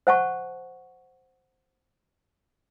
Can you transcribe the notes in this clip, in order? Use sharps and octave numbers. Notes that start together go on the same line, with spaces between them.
C5 F#5 A5 C#6